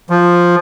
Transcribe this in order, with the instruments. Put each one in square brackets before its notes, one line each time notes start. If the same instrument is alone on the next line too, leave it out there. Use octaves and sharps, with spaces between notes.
[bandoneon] F3